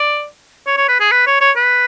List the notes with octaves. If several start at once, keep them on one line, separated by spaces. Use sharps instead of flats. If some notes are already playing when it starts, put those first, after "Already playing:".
Already playing: D5
C#5
C#5
B4
G#4
B4
C#5
C#5
B4